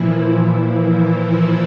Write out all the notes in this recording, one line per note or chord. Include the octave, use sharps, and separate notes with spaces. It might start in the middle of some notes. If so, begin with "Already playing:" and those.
Already playing: A#2 E3 F3 E4